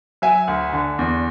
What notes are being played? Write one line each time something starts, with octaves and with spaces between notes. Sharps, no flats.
F#3 E5 G#5
D2
D3
E2